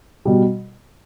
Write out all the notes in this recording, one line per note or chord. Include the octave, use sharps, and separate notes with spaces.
B2 G3